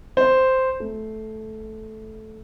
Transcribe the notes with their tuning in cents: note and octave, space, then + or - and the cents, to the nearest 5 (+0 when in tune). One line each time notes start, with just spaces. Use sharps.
C5 -5
A3 -10